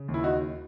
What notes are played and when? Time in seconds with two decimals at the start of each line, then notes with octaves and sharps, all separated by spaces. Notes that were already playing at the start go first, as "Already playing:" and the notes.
Already playing: C#3
0.08 D#2
0.14 E4
0.23 D#4 F#4